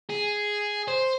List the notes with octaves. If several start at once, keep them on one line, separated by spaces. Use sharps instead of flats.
G#4
C5